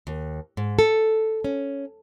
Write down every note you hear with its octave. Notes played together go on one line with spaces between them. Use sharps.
D#2
G#2
A4
C#4